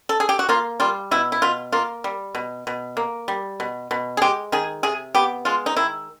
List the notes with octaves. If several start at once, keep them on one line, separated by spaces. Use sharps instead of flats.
A4
G#4
G4
F#4
A#3 F4
G3 F4
B2 E4
E4
B2 F4
A#3 F4
G3
B2
B2
A#3
G3
B2
B2
G#4
G#3 G4
D#3 G#4
C3 G#4
B3 G4
G#3 F4
D#4
D#3 E4